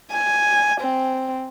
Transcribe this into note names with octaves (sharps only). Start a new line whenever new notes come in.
G#5
C4